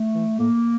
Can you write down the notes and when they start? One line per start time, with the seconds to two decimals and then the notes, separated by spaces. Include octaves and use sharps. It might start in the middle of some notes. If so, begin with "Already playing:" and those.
Already playing: A3
0.15 E3
0.38 A2 A#3